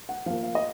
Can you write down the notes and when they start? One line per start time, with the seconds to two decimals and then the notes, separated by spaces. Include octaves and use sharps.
0.09 F#5
0.26 F3 A#3 F5
0.43 F5
0.55 D#5